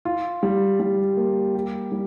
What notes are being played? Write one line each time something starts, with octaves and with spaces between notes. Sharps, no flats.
F4
G3
G3
A#3
G4
G3